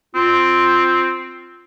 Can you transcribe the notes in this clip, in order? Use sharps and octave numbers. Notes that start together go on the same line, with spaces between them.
C4 F4